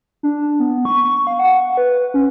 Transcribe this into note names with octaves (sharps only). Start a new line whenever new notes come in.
D4
B3
C#6
C#6
F5
F#5
B4
C#4